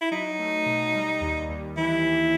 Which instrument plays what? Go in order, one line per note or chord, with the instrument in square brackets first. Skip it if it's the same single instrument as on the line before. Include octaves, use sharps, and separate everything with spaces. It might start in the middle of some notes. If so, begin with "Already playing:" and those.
[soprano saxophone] E4
[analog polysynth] F#3 [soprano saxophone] D#4
[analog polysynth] A3
B2
G3
D#2
D#2
[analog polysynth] E3 [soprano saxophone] E4
[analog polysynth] E3